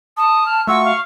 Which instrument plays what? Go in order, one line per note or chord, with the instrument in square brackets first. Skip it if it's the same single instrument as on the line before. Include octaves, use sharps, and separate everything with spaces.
[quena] A5 [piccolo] D#6
[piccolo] F6
[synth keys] A3 F4 F#4 [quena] C#6 [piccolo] E6
[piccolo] F5